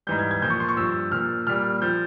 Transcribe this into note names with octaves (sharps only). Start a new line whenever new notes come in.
G#2 E3 G3 G6
G#6
G#6
A#2 F3 G6
C#6
C6
C#6
G2 F3 E6
A#2 F3 F6
A#2 G3 F6
F3 G6